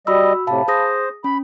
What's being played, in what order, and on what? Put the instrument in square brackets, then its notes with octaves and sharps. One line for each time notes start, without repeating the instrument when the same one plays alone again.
[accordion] G3 D#5 [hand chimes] F#4 B5 E6
[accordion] A2 C3 [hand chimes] F5 A5 B5
[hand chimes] G#4 D#6 A#6 [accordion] C5
[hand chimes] C#4 [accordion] B5